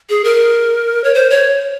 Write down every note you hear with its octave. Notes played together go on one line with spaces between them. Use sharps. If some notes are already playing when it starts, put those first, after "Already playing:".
G#4
A#4
C#5
C5
C#5